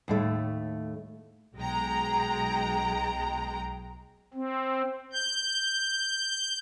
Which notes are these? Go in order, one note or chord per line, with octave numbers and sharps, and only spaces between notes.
D#2 A2 A3
B1 G#3 G5 A#5
C4
G6